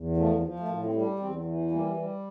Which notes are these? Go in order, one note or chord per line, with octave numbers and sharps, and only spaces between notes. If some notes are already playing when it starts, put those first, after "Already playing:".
Already playing: E2
F3 A3
F3
A3
A2 A#3
C4
G3
D4
E2 C4
E3
G3 A#3
G3